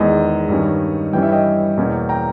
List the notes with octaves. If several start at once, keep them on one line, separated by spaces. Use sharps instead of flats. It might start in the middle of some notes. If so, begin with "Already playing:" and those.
Already playing: E2 D#3 G#3 D#5
G2 D#3 G3 C#4
G2 E3 G3 C#4 G5
E5
D#5 G5
E2 B2 A#3 C#4
G5 A#5